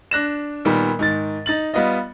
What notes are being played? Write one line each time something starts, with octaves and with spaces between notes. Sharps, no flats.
D4 F#6 A#6 E7
A#2 D#3 G3 B3
G#2 D#3 A6
D#4 A6 F#7
G3 B3 F4 D#5